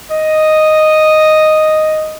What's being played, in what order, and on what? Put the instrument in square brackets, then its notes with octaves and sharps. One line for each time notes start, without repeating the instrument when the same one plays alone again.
[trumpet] D#5